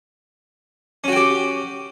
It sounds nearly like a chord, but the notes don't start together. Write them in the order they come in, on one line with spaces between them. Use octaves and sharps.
C#4 F#4 G5 G4